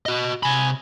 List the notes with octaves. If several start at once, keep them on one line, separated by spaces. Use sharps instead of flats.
F#4 D#5
C3 G#5 B5